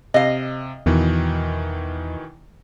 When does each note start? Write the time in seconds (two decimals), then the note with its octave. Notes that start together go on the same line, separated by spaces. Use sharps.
0.14 C3 D#5 F5
0.86 E2 B2 D#3 E3